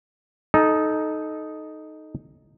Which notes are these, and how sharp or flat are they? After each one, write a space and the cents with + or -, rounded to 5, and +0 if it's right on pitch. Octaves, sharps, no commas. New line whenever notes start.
D#4 +0 A4 -20